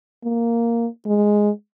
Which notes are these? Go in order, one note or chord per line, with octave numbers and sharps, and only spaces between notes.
A#3
G#3